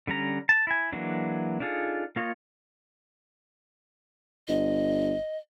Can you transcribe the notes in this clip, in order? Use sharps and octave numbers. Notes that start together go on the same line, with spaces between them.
D3 G3 C#4 A#5
A5
E4 G#5
E3 F#3 G#3 A#3 D4
D4 D#4 F4 G#4 A4
A#3 F4 C#5 D#5
G1 D#5